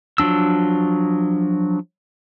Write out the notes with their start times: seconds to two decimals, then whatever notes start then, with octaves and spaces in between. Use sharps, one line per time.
0.18 F3 F#3 D4 E6